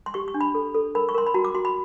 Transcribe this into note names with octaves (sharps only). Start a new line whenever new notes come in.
C6
G4 C#6
C#6
D4
B5
A4
A4
A#4 B5
C#6
A#4 C6
B5
F#4 A#5
D6
F#4 C6
B5